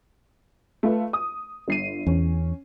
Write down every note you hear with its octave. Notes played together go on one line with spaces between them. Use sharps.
A3 F4 B4
D#6
G1 C7 D#7
E2 C#4